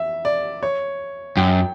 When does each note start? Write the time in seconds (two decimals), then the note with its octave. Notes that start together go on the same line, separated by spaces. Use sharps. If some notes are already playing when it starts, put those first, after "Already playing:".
Already playing: E5
0.25 D5
0.63 C#5
1.37 F#2 G5